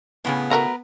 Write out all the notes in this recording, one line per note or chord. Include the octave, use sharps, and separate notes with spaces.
A2 C#3 B3 G#4
A3 F#4 A#4 B4 A#5